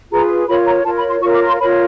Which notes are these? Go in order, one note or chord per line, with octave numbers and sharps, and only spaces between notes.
F4 G#4 B4 A#5
F4 A#4 C#5 B5
A#5
F4 A#4 C#5 A5
B5
C6
F4 A#4 C#5 C#6
D6
C6
F4 A#4 C#5 B5